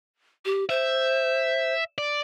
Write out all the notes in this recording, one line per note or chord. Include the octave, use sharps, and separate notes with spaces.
G4
C5 E5
D5